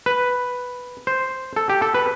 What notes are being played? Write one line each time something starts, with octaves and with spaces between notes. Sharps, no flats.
B4
C5
A4
G4
A4
B4